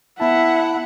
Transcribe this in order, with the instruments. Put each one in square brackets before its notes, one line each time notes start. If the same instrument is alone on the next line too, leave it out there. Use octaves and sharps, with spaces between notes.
[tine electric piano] B3 A5 [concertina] E4 [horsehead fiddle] E5 [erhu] F#5